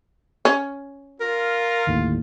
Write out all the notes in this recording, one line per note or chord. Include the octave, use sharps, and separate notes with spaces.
C#4
F4 A#4
G1 D#2 A2